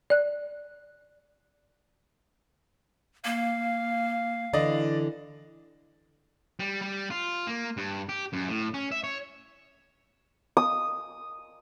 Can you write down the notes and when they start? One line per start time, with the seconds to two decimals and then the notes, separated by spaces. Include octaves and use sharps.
0.10 D5 F#6
3.25 A#3 F5
4.53 D3 E3 D5 D#5
6.59 G3
6.82 G3
7.10 F4
7.47 A#3
7.77 G2
8.09 G4
8.33 F#2
8.49 A2
8.74 C#4
8.91 E5
9.04 C#5
10.57 D#6